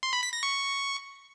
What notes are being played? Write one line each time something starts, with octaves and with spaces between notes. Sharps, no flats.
C6
B5
B6
A#6
C#6